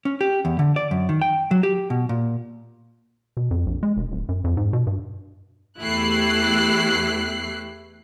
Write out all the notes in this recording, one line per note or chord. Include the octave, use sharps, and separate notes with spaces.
C#4
G4
E2
D3
D5
F#2
D#3
G5
F#3
G4
B2
A#2
B2
F2
A#1
G#3
F1
D1
F#2
F2
G#2
B2
G2
E2 A3 E4 G4 F#6 C7